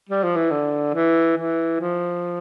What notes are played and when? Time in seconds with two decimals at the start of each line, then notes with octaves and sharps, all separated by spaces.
0.09 G3
0.23 F3
0.36 E3
0.50 D3
0.94 E3
1.37 E3
1.80 F3